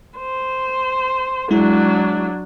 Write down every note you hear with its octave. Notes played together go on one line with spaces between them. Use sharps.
C5
F#3 G#3 D4 E4